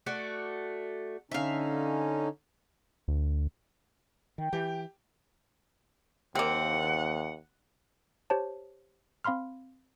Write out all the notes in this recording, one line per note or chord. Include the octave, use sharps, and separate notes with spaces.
A3 F#4 D5
D3 C#4 D#4 E5 F5
D2
D#3 G5
E3 G4
D#2 A#3 C4 F#5
G4 C5 C#5 A5
C4 F5 B5 C6 F6